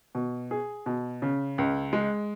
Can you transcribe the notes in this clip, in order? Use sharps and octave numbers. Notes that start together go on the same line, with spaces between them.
B2
G#4
B2
C#3
C#2
G#3